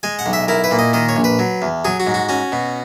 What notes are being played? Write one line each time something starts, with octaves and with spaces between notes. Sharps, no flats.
G#3 G#5
F#5
B1
E5
E4 A#4
B4
A#2
D#5
D#3 D#5
C#5
A#1
B4
F#3
E2
F#3 G#4
F#4
G#2
F#4
C#4 F#4
B2